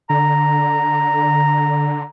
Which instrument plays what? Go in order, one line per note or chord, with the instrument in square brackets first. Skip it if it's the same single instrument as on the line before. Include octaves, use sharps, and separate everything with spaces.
[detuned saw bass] D3 [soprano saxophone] A#5